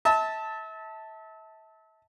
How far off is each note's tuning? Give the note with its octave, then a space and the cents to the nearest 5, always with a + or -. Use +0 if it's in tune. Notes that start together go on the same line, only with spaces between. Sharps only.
E5 -35 A5 +0